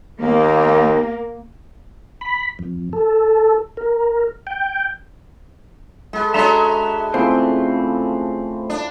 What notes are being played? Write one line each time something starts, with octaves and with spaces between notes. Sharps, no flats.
D#2 A#3
B5
F2
A4
A#4
G5
G#3 A4 B4
G#3 C#4 D4 F#4 E5 A#5 C6
C#3 E3 F3 A3 C4 C5
D4